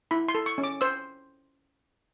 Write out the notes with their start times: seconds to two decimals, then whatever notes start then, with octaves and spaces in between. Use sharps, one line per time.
0.11 E4 B5
0.28 C6
0.35 A4
0.46 C#6
0.58 C#4
0.64 D6
0.81 C5 E6